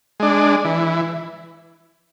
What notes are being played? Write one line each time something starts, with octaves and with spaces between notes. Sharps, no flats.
G#3 D4
E3